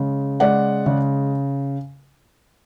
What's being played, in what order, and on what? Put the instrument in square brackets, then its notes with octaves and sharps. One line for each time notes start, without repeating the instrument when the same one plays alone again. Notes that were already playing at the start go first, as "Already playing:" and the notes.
Already playing: [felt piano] C#3 G#3
G#3 D5 F#5
C#3